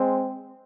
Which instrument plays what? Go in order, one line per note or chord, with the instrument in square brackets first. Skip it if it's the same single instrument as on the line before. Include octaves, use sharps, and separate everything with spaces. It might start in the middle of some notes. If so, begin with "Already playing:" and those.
Already playing: [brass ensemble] G#3 C4